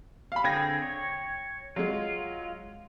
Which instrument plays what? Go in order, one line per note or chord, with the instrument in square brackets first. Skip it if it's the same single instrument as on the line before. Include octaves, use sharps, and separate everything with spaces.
[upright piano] F5 B5
[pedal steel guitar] D3 C4 G#4 [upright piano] G5 G#6 A#6
[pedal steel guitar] C#5
[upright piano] F#3 G#3 [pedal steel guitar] F4